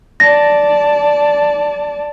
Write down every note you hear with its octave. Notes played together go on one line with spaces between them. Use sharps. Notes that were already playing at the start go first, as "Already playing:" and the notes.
D5 A5 A#6